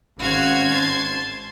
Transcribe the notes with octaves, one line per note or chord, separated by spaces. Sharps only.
G#1 C#4 F#4 C5 F5 G#6
A5 C6